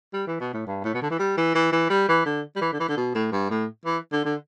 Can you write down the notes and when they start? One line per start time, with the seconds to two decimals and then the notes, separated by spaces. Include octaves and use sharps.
0.14 G3
0.27 E3
0.41 B2
0.53 A2
0.67 G2
0.84 A2
0.94 B2
1.02 D3
1.11 E3
1.19 G3
1.37 E3
1.55 E3
1.72 E3
1.90 G3
2.09 E3
2.26 D3
2.56 G3
2.61 E3
2.73 D3
2.80 E3
2.89 D3
2.97 B2
3.15 A2
3.32 G2
3.50 A2
3.86 E3
4.12 D3
4.25 D3